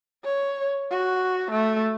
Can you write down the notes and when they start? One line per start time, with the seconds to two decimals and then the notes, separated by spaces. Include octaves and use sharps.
0.24 C#5
0.91 F#4
1.51 A3